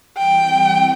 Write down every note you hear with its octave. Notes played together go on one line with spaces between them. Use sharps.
E3 G3 C4 G5